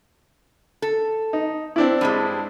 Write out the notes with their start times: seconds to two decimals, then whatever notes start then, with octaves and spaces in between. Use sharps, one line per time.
0.82 A4
1.33 D#4
1.76 C4 D4 E4
2.01 G2 G3 G#3